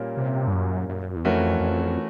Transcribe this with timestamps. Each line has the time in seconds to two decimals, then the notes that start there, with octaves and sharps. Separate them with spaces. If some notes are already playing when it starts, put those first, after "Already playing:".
Already playing: A#2 G3 A#3 C#4
0.17 C3
0.47 G2
0.53 F#2
0.89 F#2
1.16 E2
1.25 F2 E3 A3 C#4 F#4 A#4
1.60 F2